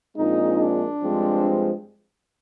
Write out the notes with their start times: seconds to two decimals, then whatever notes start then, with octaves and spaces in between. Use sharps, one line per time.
0.16 A#1 A#2 G#3 C4 D#4
0.59 D4
1.03 G2 F3 G#3 C4